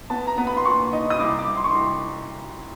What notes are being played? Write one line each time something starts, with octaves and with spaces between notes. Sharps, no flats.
B3 A5
A#5
B3
B5
C6
A#2 C#6
D#4
D#6
C2 D6
D6
C2
C6
C#6
C2 C6